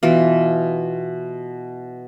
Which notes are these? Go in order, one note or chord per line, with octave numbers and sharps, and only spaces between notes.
B2 E3 F4